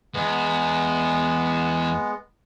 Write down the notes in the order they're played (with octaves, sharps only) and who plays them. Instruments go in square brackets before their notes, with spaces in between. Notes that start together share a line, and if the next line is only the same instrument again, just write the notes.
[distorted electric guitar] E2 [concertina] G#3 B3